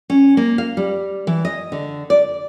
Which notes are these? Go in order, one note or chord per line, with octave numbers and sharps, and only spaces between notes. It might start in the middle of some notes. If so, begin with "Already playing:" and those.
C#4
A#3
F5
G3
E3
D#5
D3
D5